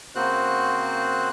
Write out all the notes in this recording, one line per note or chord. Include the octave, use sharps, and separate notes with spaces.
C#3 A#3 C4 F#4 C5 F#6